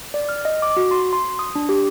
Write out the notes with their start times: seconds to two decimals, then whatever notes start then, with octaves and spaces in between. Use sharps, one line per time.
0.14 D5
0.29 F6
0.45 D#5
0.62 D6
0.77 F#4
0.91 C6
1.13 C6
1.39 D#6
1.55 D4
1.69 G4